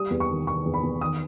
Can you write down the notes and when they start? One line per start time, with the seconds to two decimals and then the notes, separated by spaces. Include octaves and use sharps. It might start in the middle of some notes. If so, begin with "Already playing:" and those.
Already playing: G3 D#6
0.10 E2
0.20 C#6
0.29 D#3
0.46 D#3 C#6
0.66 E2
0.74 B5
0.83 E2
1.01 D#3 D#6